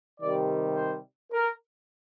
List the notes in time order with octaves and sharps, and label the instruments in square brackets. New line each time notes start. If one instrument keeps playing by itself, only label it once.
[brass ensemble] C3 D#3 G3 D5
C5
A#4